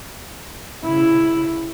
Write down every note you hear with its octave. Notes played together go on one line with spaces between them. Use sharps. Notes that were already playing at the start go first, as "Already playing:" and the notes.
C#3 E4